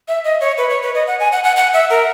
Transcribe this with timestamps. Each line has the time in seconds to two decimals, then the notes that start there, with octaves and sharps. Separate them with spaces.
0.08 E5
0.24 D#5
0.41 C#5
0.58 B4
0.70 C#5
0.82 B4
0.95 D#5
1.07 F#5
1.20 G#5
1.32 F#5
1.44 F#5
1.56 F#5
1.73 E5
1.90 A#4